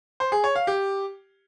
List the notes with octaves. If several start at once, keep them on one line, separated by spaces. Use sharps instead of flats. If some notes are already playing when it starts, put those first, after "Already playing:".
C5
G#4
C#5
F5
G4